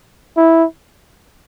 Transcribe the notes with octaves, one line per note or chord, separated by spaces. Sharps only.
E4